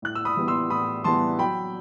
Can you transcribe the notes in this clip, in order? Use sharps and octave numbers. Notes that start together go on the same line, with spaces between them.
A2 F#6
E6
B5 D#6
E3 G3 B3
C6 E6
A2 B5 D#6
E3 G3 B3 A5 C6
F#3 G5 B5